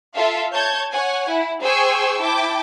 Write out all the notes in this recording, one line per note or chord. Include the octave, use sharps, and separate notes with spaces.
F4 A4 E5 F5
C#5 A5 G6 G#6
C#5 F#5 G#5
E4
G#4 C5 G5 G#5 C#6 E6
E4 G5 A5 D6